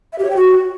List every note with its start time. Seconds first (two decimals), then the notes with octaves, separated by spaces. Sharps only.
0.13 E5
0.19 G4
0.24 C#5
0.30 G5
0.36 F#4